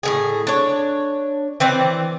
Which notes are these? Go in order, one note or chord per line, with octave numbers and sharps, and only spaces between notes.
A2 D#3 G#4
D4 C#5
E3 C4 D5